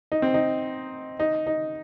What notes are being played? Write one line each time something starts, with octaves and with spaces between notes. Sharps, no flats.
D#4
C4
D#4
D#4
D#4